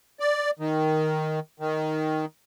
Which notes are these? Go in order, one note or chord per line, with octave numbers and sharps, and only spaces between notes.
D5
D#3
D#3